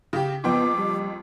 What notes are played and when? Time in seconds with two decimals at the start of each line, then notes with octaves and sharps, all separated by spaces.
0.13 C#3 G4
0.44 F#1 F2 B3 G5 D6
0.78 G3